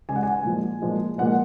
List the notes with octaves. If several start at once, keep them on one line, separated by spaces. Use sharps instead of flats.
C#3 G#3 G#5
F#5
G#5
A#2 F3 G#3
A#2 F3 G#3
A#2 F3 G#3 F#5